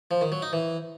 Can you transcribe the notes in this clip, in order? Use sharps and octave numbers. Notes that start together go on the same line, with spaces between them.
F3
D#3
F#3
D#4
E3